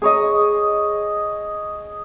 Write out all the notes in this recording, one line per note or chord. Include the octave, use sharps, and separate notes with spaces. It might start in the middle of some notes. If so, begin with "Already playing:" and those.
G#4 C#5 D#5